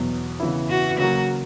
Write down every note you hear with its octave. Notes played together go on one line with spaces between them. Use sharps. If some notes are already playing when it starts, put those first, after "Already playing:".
Already playing: E2 B2 F#3
C#3 E3 B3 E4
F#4
C#3 F#3 A#3 F#4